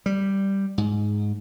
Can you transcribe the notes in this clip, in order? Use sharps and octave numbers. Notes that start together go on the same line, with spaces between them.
G3
G#2